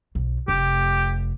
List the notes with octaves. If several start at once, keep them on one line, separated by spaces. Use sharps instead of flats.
B1
F1 G4